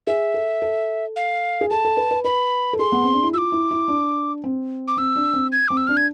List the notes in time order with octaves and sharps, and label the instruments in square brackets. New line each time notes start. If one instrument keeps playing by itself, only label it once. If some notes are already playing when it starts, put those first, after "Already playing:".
[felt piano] G#4 [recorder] E5
[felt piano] A4
A4
[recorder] F5
[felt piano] G#4
[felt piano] A4 [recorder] A5
[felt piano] A4
B4
B4
[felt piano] B4 [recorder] B5
[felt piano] A4
[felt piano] G#4 [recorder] C6
[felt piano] B3
C4
D4
E4
[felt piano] F4 [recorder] E6
[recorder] D6
[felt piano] E4
E4
D4
C4
[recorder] D6
[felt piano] C4 [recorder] E6
[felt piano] D4
C4
[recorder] G#6
[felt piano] C4 [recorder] D6
[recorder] E6
[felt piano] D4 [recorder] F6
[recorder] G#6